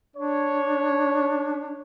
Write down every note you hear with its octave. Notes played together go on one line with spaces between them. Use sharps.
D4 C#5